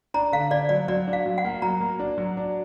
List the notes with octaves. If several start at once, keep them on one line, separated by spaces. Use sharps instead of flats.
D4 A#5
D3 F5
D4 D5
F#3 D5
F#3 D5
D4
F5
F#3
F#5
A#3
F#3 A#5
A#3
D4
F#3
D4